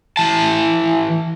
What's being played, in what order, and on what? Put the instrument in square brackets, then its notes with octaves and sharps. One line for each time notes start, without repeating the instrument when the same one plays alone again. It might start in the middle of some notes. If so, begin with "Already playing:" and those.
[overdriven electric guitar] E3 A5